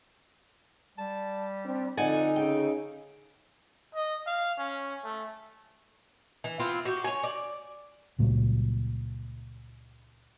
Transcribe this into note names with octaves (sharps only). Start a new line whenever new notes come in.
G3 A5
C4 D4
F2 D3 D#4 D5 F#5 G#5
C#3 G5
D#5
F5
C#4
A3
E3
B3 C4 E4 F4
F#4 G4
C#5 G#5
D5
C#2 A#2 F#3 G3